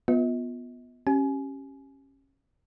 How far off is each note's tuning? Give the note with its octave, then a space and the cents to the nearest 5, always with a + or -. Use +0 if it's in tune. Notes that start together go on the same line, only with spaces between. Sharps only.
B3 -5 F4 +15 D#5 +45
C#4 -20 G4 -15 G#5 +25